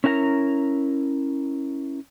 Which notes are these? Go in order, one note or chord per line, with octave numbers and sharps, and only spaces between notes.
C#4 E4 A#4 F#5 A#5